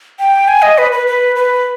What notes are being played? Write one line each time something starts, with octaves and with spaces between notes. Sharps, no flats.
G5
G#5
D#5
B4
B4
B4
B4